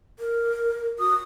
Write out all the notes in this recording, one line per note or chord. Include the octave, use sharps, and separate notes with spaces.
A#4
F#4 D#6